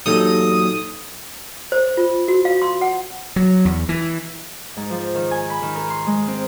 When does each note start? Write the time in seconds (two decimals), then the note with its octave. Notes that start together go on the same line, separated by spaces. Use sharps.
0.06 E2 A#2 F#3 D#4 G4 A4 D#6
1.72 C5
1.97 F4
2.28 F#4
2.45 F5
2.62 C6
2.81 F#5
3.36 F#3
3.65 E2
3.89 E3
4.77 G#2
4.90 F3
5.15 D#3
5.31 G#5
5.50 B5
5.62 D#3
5.76 A#4
5.90 C6
6.07 G#3
6.28 C4